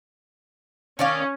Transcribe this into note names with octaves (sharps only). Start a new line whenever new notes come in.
D#3 C#4 D5 F5